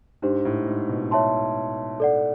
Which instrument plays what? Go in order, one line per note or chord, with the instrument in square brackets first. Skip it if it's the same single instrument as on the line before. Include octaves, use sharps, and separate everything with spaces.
[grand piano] G#2 [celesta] D4 G4 C5
[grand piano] A2
G#2
B2
[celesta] C#5 E5 A5 C6
A4 D5 F#5